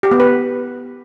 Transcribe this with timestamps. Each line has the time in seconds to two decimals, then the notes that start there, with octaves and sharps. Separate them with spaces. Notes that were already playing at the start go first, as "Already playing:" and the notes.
0.03 G4
0.11 B3
0.20 B4